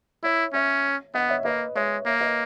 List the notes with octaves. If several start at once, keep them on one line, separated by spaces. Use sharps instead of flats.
E4 C#5 E5
C#4 C#5 E5
B3 D#5 F#5
C#5 E5
A#3 B4 D#5
G#3 C#5 E5
A#3 C#5 E5
B4 D#5